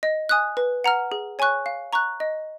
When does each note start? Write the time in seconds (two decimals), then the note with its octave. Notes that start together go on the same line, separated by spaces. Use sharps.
0.03 D#5
0.29 G#5 D#6 F#6
0.57 B4
0.84 F#5 A#5 F6
1.12 G#4
1.39 C#5 G#5 C#6 F#6
1.66 F5
1.93 A#5 C#6 F#6
2.20 D#5